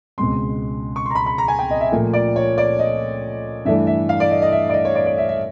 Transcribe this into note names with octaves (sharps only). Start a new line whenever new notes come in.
C#2 B2 G#3 C4 C6
C#6
A#5 C6
B5
B5
A#5
G#5
G5
D#5
E5
A#2 F3 A3
D5
C#5
D5
D#5
G2 E3 A3 D4 E5
E5
F5
D5
D#5
D#5
E5
D5
D#5
C#5
D5
D5
E5
E5